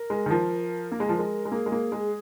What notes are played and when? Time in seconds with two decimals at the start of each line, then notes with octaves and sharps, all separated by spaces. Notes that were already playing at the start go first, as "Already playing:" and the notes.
Already playing: A#4
0.10 G#3
0.26 D#3
0.31 F3
0.92 A#3
1.00 G#3
1.09 F3
1.19 G#3
1.45 G#3
1.52 A#3 G#4
1.66 G#3
1.72 A#3
1.92 G#3